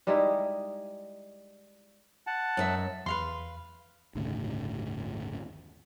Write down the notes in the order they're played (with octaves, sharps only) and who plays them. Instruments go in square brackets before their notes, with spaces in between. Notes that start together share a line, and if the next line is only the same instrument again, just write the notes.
[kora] G3 G#3 D#4 E4
[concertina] F#5 A5
[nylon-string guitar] F#2 D#5 E5
[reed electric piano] E2 [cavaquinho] B4 F5 C6
[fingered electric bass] G1 D#2 A2 C#3